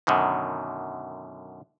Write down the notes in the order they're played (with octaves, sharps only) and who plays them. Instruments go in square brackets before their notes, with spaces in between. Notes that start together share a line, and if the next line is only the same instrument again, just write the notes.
[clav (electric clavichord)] F#2 B2 D3 D#3